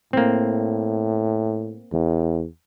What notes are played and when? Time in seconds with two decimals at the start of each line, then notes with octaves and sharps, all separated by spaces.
0.13 A2 A#3 C4
1.92 E2